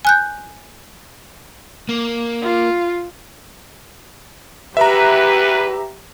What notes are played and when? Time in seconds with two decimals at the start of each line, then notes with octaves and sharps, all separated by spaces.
0.05 G#5 F#6 G6
1.89 A#3
2.42 F4
4.77 E2 G4 B4 E5 A#5